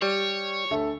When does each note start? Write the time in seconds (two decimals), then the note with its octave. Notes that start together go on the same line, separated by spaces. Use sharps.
0.02 G3 C#5
0.71 D2 A4 E5